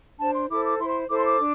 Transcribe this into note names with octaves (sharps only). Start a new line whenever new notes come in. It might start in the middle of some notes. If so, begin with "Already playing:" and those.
D4 C5 A5
C6
E4 A4 C5 D6
D6
E4 C5 C6
C6
E4 A4 C5 D6
C6
D6
D4